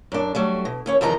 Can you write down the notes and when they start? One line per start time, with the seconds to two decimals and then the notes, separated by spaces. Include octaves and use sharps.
0.12 F#2 D4
0.35 F#3 G3 A3
0.65 B2
0.86 D#2 C#4 C#5
1.01 E2 C3 D#3 F3 D#4 A#5